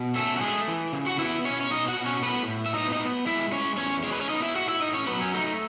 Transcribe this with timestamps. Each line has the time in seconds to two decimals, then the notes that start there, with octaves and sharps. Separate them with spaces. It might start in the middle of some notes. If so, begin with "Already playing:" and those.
Already playing: B2
0.15 A3 C#4 A4
0.37 F#4
0.41 G#3 A3 G#4
0.68 E3
0.93 C#3
1.06 F#4 F#5
1.19 B3 E4 E5
1.45 B2 C#4 C#5
1.61 C#5
1.70 B2 D#4 D#5
1.88 F#4 F#5
1.96 B2
2.06 C#4 C#5
2.22 A2 B3 B4
2.48 A2
2.66 E5
2.74 B3 D#4 D#5
2.92 D#4 D#5
3.00 B3
3.26 G#3 E4 E5
3.52 G#3 C#4 C#5
3.77 E2 C#4 C#5
4.04 G#3 C#5
4.12 B4
4.20 C#4 C#5
4.29 B3 D#4 D#5
4.42 E4 E5
4.55 A2 F#4 F#5
4.68 E4 E5
4.81 A2 D#4 D#5
4.95 C#4 C#5
5.07 F#3 B3 B4
5.21 C#4
5.34 A3 D#4